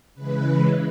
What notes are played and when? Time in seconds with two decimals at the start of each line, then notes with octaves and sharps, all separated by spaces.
0.15 C#3 E3 G#3 B4